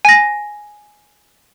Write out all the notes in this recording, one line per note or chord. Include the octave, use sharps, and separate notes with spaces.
G#5 A#6